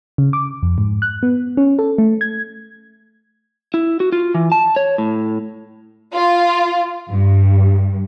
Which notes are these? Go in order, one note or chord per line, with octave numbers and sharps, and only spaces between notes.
C#3
D6
F2
G#2
F#6
B3
C#4
A4
A3
G#6
E4
F#4
F4
E3
A5
C#5
A2
F4
G2